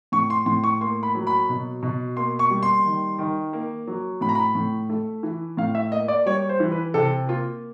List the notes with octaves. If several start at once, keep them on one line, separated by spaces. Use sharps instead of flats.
A2 C#6
C6
A2 C6
C#6
A#3 C6
B5
F#3
B5
B2
B2
A#3 C6
C#6
G3
C6
D#3
D#3
A#3
F#3
A2 B5
A#5
B5
A2
A3
E3
A2 F5
E5
A#3 D#5
D5
G3 C#5
C5
E3
B4
C3 A4
A#3 F4